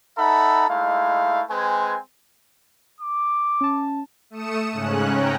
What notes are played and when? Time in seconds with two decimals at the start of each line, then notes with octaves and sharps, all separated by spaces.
0.18 D#4 A4 E5 F#5 A#5 B5
0.69 G#3 A3 D#4 E4 F5
1.50 G#3 C4 B4 G#5
3.01 D6
3.61 C#4 A5
4.30 A3 D#6 C#7 E7
4.72 G#2 C#3 C#4 F#6
5.08 C#4 G5 A#5